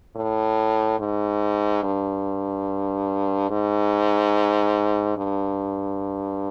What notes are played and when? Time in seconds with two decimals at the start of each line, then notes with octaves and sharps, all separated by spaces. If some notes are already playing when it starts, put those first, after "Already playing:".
0.16 A2
0.99 G#2
1.83 G2
3.50 G#2
5.17 G2